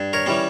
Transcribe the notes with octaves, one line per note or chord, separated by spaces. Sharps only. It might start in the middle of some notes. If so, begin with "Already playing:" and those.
Already playing: G2
A#4 C#5
E3 G3 C#4